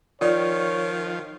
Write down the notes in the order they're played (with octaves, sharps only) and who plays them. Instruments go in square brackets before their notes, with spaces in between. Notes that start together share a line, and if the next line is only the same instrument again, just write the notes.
[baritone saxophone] D#3 [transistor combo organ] F3 [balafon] F4 D5 [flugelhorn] C#5